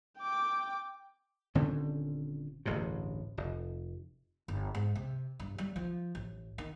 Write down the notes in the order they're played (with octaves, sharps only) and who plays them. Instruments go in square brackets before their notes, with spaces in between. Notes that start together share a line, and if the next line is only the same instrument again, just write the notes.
[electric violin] G5 D6
[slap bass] D#1 D3 C4 C#4
D1 A1 G2 C3
F1
[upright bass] G1
G#2
C3
G2
G3
F3
A1
D#3